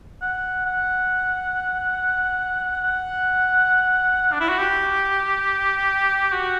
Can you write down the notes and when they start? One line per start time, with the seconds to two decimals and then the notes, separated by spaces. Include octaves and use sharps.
0.22 F#5
0.66 F#5
2.83 F#5
4.32 D4
4.40 E4
4.49 F#4
4.58 G4
6.32 F#4